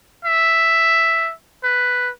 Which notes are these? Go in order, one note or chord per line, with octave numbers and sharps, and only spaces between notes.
E5
B4